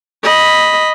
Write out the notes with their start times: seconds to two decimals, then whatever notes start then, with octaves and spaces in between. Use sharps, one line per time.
0.23 D#5 B5